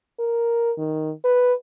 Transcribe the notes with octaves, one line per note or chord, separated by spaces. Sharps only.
A#4
D#3
B4